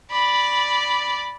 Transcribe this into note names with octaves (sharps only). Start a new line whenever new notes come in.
D5 B5